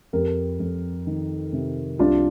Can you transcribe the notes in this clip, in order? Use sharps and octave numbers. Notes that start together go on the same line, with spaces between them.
F2 G4 A#4
F2
D#3
C3
C2 D4 F4